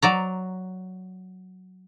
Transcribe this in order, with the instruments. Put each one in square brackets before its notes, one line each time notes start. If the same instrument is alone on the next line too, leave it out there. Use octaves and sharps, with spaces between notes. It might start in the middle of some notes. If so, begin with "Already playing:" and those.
[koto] F#3 D5 A#5